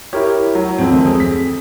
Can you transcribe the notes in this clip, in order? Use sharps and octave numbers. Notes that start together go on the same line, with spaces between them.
E4 G4 A#4 C#5
F#3
F2 G#2 C4
D2 D#3 G#3
G#4 A4
B6